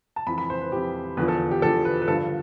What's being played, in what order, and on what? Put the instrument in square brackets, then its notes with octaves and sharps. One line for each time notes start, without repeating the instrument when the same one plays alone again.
[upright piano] A5
F2 E3 B5
B5
C5
B4
F2 E3 G4
E2 D3 F3 B4
A4
G4
E2 D3 F3 A4
B4
B4
G2 D3 F3 A4